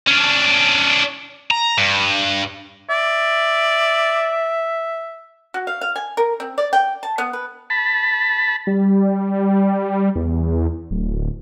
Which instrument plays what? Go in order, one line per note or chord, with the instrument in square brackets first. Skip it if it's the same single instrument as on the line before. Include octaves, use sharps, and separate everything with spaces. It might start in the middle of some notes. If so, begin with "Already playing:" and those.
[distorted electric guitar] C#4 D4
A#5
G2
[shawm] D5 [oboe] E5
[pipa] F#4
F5
F5
G#5
A#4
C4
D5
G5
A5
B3
B4
[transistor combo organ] A5 B5
[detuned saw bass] G3
E2
D1